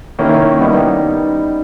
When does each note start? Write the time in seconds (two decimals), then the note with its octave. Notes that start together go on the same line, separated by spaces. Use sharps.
0.19 D#3 A#3 C#4 E4
0.59 G3 B3 D#4